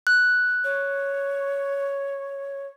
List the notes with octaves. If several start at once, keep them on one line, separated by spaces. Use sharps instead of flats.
F#6
C#5